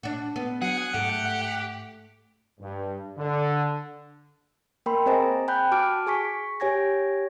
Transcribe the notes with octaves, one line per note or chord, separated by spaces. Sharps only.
D4 F#4
B3
F#3 G#4 F#5 C#7
G#2 A3 G4
G2
D3
A#3 A#4 G5 B5 C6
C4 G#4 C5 D#5 G#5 A#5
G5 G#5 B5 F#6 G6
F#4 A5 D6 F6 D7
G#4 G#5 C#6 B6
G4 C#5 G#5 G#6 A#6